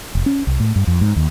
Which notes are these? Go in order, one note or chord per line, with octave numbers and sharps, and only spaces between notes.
F1
C#4
C2
A2
G2
F2
G#2
D#2